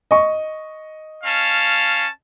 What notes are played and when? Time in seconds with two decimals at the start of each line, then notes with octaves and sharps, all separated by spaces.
0.11 D#5 C#6
1.24 C#4 F5 A5